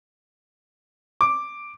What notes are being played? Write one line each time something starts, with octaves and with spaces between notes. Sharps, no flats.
D6